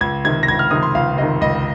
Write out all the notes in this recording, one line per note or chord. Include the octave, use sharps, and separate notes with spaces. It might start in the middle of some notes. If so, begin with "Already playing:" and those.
C#2 G#6
C3 D#3 G#6
A#6
C#2 G#6
F6
C3 D#3 D#6
C6
C#2 F5
C3 D#3 D#5
C#2 D#5